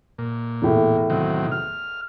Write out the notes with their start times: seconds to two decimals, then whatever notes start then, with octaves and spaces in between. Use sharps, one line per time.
0.18 A#2
0.62 E2 A2
1.10 C3 D#3 F#3
1.52 F6